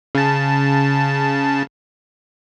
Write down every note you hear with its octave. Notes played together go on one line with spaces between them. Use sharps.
C#3 A5